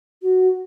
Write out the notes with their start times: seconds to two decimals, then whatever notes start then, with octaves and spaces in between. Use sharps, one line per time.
0.22 F#4